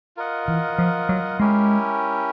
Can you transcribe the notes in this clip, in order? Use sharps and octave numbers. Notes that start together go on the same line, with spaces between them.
F4 A#4 D#5 F#5
E3
F3
F#3
G#3 C#4 E4 G4 A#4